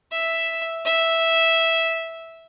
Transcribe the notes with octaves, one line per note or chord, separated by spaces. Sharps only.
E5
E5